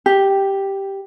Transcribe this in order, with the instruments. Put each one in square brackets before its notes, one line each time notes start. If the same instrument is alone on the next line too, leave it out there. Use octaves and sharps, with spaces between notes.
[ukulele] G4